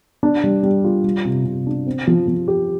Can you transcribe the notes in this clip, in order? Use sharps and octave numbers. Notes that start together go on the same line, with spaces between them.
D4
G3
G3
F4
G3
C3
C3
D4
C4
F3
F3
G4